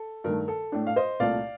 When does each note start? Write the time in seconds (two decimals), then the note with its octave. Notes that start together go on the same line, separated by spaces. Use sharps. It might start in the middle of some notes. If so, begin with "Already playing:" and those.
Already playing: A4
0.24 G2 D#3 A3 A#4
0.48 A4
0.72 A2 A3 D4
0.87 F5
0.96 C5 D#5
1.20 C2 A#2 A3 D5 F5